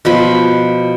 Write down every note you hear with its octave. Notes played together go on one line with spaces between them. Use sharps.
B2 F3 B5